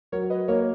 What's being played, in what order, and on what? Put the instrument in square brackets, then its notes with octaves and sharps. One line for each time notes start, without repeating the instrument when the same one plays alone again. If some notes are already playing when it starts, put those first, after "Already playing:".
[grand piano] F#3 [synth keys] A#4 C#5
[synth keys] B4 D#5
[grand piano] A#3 [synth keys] A#4 C#5